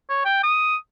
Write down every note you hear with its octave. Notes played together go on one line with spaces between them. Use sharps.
C#5
G5
D#6